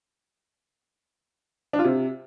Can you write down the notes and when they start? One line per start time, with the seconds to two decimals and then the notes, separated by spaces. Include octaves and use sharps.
1.73 D4
1.79 F4
1.85 C3